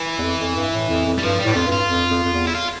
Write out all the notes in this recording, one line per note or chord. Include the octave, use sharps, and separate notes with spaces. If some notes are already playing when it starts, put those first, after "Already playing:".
Already playing: E3
E2
F2
F2
G2
A2
F2
F2
G3
G2 F3
G3
A2
F2 F4
G2 F4
F2
F2
F2
E2
E4
F4